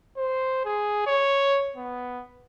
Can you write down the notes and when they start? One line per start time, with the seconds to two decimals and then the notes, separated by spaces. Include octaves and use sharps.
0.18 C5
0.65 G#4
1.06 C#5
1.76 B3